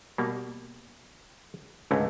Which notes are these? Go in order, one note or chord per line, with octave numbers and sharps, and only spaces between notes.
B2 G3 A#3
C#2 G#2 D3 A3 C4 C#4